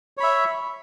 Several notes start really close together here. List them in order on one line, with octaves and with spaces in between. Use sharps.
C#5 B5 E5